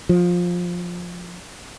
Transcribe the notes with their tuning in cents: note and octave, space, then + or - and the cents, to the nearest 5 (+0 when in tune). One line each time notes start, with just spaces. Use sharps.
F3 +15